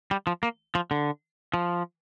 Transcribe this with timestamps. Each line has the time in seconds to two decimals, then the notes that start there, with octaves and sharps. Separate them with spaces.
0.11 G3
0.27 F3
0.43 A#3
0.75 F3
0.91 D3
1.54 F3